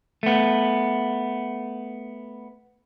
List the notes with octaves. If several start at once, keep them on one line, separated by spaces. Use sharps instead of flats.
A3 B3